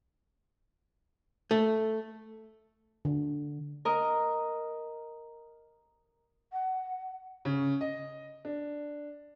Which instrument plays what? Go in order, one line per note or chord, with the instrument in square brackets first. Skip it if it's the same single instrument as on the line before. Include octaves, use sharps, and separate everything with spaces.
[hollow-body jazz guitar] A3
[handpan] D3
[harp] A#4 D#5
[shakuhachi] F#5
[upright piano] C#3
D#5
D4